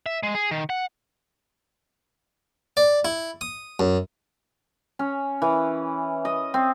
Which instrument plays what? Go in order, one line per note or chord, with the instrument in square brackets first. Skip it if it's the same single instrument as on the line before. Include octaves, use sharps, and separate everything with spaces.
[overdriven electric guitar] E5
G#3
G#4
D#3
F#5
[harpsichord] D5
E4
D#6
F#2
[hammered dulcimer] C#4
E3
D#5
C4